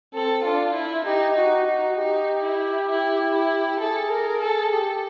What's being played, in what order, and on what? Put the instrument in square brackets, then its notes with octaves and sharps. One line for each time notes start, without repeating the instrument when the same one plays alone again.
[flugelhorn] C4 [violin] A4
[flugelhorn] D4 [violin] F4
[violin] E4
[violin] D#4 [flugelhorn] G4
[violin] D#4 [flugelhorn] F#4
[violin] D#4 [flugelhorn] F#4
[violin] D#4 [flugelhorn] G4
[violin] E4
E4
E4
[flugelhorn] G#4 [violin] A4
[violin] A#4
A4
[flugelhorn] G4 [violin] A4